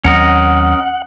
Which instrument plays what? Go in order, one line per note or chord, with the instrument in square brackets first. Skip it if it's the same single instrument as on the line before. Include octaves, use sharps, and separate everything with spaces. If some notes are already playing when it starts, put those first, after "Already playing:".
[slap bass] D#2 F#3 C4 [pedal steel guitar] C#4 A#4 D#5 [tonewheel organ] F#5